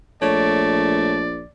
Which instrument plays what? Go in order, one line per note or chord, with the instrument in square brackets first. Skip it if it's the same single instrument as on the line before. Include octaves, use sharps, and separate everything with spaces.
[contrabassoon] A#1 [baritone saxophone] A3 [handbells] C#5 [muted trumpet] D5